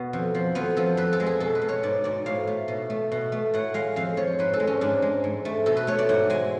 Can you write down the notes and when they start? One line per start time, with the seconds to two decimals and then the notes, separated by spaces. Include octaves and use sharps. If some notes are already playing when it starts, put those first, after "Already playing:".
Already playing: B2 B3
0.13 F2
0.35 F3
0.55 F2 B3
0.77 F3 A4
0.97 F2 B4
1.13 A4
1.20 G#3
1.26 G#4
1.40 B2 A4
1.55 B4
1.62 B2
1.69 C#5
1.83 G#2 D5
2.04 G#2 D5
2.26 A2 F5
2.47 A3
2.68 B2
2.90 A3
3.12 B2
3.32 A3
3.54 A2 F#5
3.74 G#3 F5
3.96 F2 F5
4.17 F3 C#5
4.39 G#2 B4
4.53 A4
4.60 G#3
4.67 C#4
4.81 G#2 D4
5.02 G#3
5.24 G#2
5.45 A3
5.66 B2 A4
5.77 B4
5.87 A3 C#5
5.99 D5
6.09 G#2 F#5
6.30 G#3 G#5